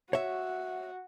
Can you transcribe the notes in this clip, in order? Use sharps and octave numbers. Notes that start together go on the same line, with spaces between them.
F#4 C#5 E5